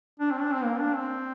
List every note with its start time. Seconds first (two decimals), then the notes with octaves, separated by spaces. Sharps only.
0.20 D4
0.31 C4
0.41 D4
0.52 C4
0.64 A#3
0.79 D4
0.95 C4